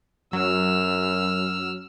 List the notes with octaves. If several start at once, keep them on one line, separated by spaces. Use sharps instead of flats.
F#2 F#3 E6 F6